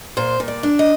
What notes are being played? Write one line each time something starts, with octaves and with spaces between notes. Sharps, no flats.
A#2 C5
A#2
D5
D4
D#5